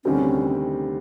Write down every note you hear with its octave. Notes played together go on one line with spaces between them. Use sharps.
D2 C3 D#3 G3 C4 C#4